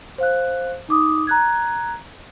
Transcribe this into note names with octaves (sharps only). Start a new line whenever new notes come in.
C5 F5 F#6
D#4 D6 D#6
A#5 F#6 G#6